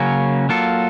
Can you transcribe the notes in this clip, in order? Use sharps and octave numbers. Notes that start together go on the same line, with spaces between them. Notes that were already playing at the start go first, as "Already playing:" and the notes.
Already playing: C#3 F#3 A#3 C#4
F#3 A#3 F4 A4